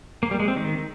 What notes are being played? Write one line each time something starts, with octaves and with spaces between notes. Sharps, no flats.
A#3
G3
G#3
C4
D#3